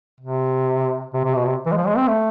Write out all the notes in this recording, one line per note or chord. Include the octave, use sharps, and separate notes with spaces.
C3
C3
C3
B2
C3
E3
G#3
F3
G#3
C4
A3